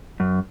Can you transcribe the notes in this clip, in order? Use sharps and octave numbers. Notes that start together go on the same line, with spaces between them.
F#2